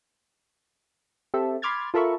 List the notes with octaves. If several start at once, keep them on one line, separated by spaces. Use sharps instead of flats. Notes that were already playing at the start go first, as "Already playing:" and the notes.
C4 G4 A4 E5
B5 C6 D6 F6 G#6 A6
F4 A4 A#4 E5 B5 C#6